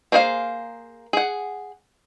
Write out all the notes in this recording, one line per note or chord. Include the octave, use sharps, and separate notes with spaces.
A#3 D4 G#4 C5 F5
G#4 F#5